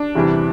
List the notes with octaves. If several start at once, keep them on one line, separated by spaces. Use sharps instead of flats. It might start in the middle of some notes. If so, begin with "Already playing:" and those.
Already playing: D4
E2 C3 E3 G3